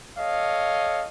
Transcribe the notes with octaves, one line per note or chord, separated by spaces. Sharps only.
A4 C#5 D#5 F5